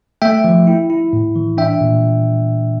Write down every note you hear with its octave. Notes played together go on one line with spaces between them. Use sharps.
A3 E5 G5
F3
E4
E4
A2
E3
D4 E5 G5
A#2